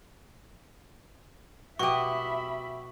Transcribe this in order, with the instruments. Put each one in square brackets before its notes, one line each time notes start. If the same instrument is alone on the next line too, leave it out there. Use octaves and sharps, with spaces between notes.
[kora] B2 D#5 [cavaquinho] F#4 G4 [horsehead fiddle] E5 B5 [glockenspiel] C#6